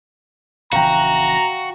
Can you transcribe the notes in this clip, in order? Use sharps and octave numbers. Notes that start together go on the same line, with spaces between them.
A#1 C#3 E3 F#4 F5 G5 A#5